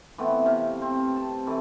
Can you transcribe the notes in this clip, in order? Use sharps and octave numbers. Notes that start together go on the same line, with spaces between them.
E3 A3 B3 C4
C3 F5
C4
A5
E3 A3